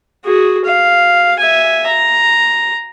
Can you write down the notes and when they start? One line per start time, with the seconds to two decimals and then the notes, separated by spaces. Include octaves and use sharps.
0.24 F#4 G#4
0.65 F5
1.39 E5 G#5
1.86 A#5